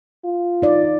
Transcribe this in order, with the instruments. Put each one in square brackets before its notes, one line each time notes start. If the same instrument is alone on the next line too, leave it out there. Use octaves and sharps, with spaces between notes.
[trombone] F4
[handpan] D#4 D5